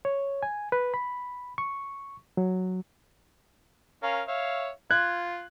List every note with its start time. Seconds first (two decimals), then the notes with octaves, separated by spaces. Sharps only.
0.05 C#5
0.43 G#5
0.72 B4
0.94 B5
1.58 C#6
2.37 F#3
4.03 C#4 A#4 F5
4.28 C#5 E5 F5
4.91 F4 F#6 G#6